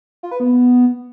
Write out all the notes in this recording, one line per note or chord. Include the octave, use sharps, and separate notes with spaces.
F4
B4
B3